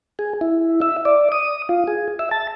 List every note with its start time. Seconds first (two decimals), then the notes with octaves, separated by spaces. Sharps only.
0.19 G#4
0.41 E4
0.82 E5
1.05 D5
1.32 D#6
1.69 F4
1.87 G#4
2.19 E5
2.31 A5